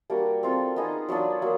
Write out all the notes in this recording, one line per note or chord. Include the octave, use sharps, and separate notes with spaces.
G3 A#3 D4 F#4
C4 F4 A4
B3 D#4 G#4
F#3 B3 D4 F4
F#3 A#3